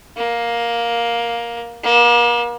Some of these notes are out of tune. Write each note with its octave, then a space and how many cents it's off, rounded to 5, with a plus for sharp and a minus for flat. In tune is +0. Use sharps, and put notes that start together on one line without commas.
A#3 +10
A#3 +40